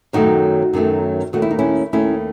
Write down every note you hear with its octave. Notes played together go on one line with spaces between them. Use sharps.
F#2 D#3 F#3 A3 D#4 F#4
F#2 D#3 F#3 A3
D#2 D#3 A3 F#4
E4
D#4
C#4 E4
D#2 D#3 A3 C#4 E4